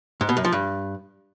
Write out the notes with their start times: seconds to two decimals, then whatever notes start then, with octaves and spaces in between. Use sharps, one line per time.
0.21 G#2
0.29 B2
0.37 F#2
0.45 F3
0.52 G2